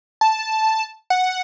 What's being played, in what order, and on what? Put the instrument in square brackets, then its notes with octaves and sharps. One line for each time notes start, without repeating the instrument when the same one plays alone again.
[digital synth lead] A5
F#5